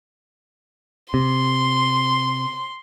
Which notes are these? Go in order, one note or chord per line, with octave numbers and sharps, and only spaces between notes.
C3 C6